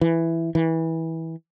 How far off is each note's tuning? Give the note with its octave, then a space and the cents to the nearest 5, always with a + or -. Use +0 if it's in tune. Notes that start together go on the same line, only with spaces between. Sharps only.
E3 +5
E3 -20